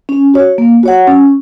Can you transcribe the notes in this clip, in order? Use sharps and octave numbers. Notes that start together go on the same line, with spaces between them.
C#4
F#4 C#5
A#3
F#4 C#5 F#5
C#4